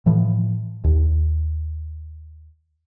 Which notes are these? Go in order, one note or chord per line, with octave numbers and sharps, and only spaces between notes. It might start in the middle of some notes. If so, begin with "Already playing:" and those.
A2 E3 F3
D#2